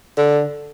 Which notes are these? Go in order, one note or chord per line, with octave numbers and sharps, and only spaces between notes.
D3